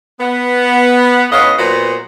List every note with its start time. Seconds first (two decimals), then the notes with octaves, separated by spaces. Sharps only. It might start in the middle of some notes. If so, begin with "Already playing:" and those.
0.21 B3
1.32 A2 B3 C#4 D#5 F5
1.58 A#2 F#3 B3 F#4 C5 D#5